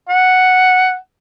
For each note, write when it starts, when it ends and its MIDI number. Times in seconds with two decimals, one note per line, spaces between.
0.09 0.96 78